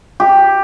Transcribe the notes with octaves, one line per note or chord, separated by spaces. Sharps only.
G4